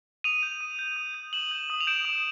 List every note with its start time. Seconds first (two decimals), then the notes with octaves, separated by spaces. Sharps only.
0.24 D#6 D#7 F7
0.43 G6
0.61 D#6
0.79 G6
0.96 D#6
1.14 G6
1.33 D#6 E7 F#7
1.51 G6
1.70 D#6
1.81 F7
1.87 G6 D7 E7
2.05 D#6